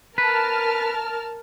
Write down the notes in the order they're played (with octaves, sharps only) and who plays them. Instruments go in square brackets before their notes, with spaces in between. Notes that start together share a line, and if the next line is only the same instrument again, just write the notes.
[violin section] A#4 A5 F6 [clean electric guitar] B4